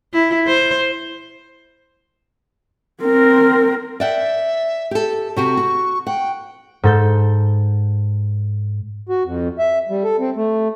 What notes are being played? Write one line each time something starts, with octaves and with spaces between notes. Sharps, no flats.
E4
C5
C4 A#4
D5 E5 F#5 G5
G4 A4
C3 F#4 G4 C#6
F#4
F#5 G5
G#2 A4 G6
F#4
F2
E5
G3
A4
C4
A3